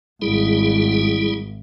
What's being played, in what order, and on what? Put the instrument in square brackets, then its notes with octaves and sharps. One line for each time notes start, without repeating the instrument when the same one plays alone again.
[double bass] G#1 [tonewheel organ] G3 E4 G#4